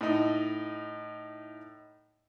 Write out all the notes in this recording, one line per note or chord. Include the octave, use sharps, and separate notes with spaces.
A2 D#4